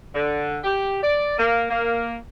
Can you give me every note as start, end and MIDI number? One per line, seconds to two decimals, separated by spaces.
0.13 0.58 50
0.64 0.98 67
1.02 1.35 74
1.38 1.65 58
1.70 2.15 58